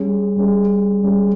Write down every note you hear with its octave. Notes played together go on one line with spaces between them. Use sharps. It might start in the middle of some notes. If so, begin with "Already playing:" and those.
Already playing: G3 C#4 G#4
G3 C#4 G#4
G3 C#4 G#4